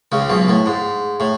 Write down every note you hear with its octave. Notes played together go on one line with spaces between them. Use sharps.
C#2 C#3
B1 B2
A2
G#2
A2